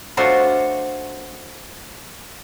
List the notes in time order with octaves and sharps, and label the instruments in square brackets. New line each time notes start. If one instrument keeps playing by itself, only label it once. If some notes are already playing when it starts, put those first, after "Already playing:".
[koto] A3 D4 F4 F#4 C5 C#5